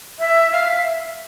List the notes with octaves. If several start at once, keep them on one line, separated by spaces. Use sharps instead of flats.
E5
F5
E5